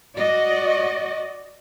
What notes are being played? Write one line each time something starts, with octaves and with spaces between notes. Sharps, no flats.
F#4 D5 D#5